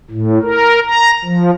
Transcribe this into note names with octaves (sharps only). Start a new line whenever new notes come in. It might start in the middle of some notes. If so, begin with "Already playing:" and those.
A2
A#4
A#5
F3